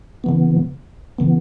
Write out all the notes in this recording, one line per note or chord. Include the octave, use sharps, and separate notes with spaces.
C#3 E3 B3
C#3 E3 B3